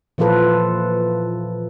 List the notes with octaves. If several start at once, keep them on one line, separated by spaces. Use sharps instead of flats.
A#2 E3 F3 F4 A4 B4